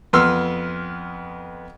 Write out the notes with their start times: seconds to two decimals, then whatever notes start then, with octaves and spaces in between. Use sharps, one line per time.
0.13 F2 B3 C6 E6 F6